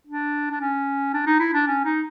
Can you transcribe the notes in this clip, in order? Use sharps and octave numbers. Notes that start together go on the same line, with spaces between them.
D4
D4
C#4
D4
D#4
E4
D4
C#4
D#4